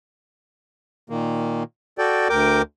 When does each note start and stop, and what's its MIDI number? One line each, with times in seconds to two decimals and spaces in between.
1.10 1.63 46
1.10 1.63 51
1.10 1.63 58
1.98 2.28 66
1.98 2.28 69
1.98 2.28 74
1.98 2.28 79
2.29 2.62 38
2.29 2.62 70
2.29 2.62 79
2.29 2.62 86